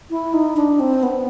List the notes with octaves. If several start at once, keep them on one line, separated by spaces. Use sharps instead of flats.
E4
D#4
D4
C4
B3